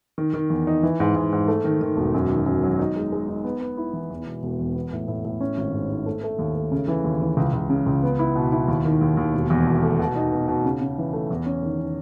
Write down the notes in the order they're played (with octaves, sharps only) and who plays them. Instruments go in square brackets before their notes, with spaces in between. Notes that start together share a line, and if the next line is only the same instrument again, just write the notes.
[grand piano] D#3
D#3
E2
D#4
E3
G#2
G#2
G#2
A3
D#3
D#3
E1
F#2
D#3
F#2
F#3
D#4
G#3
G#3
D#4
B3
B3
E4
E3
E2
E1
E1
E2
B3
A2
A2
A2
C#4
G#1
G#2
G#2
A3
A3
D#2
A3
C#3
E3
D#2
E3
C#2
C#2
C#3
C#2
B3
E4
B2
E4
D#2
D#3
D#2
D#2
E1
E2
E1
A3
B2
D#4
B2
B2
C#3
C#3
E3
A3
E2
C#4
D#3
D#3